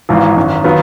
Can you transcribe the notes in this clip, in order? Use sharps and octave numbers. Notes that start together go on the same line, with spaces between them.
G#1 G#2 E3 F4
G#1 F#2 D#3
D#3 F#3 B3 F4